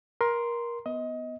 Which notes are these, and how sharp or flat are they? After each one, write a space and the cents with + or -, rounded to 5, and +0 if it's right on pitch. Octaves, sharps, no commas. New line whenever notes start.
A#4 +20 C6 +0
B3 +0 D#5 +20